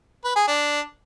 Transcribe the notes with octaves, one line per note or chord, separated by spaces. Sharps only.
B4
G#4
D4